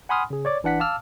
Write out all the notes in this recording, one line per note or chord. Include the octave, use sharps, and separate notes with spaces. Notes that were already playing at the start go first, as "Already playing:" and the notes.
F#5 G#5 B5 C6 D#6 F6
C#3 G#4
C#5 D5 D6
G1 E3 D4 F#5 B6
F5 A5 D6 E6 F6